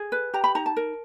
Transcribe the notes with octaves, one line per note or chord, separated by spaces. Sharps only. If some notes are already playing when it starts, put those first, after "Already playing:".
Already playing: G#4
B4
G4 A#5
B5
D#4 A#5
A5
A#4